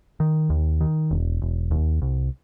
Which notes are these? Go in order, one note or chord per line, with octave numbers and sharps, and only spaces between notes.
D#3
D#2
D#3
E1
E1
D#2
C2